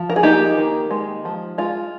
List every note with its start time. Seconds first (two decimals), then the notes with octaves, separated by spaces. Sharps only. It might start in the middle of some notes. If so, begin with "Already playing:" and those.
Already playing: F3
0.10 A#4
0.16 G#4
0.23 A#3 D#4 G4
0.57 D#3
0.91 G#3
1.25 F3
1.58 G#3 F4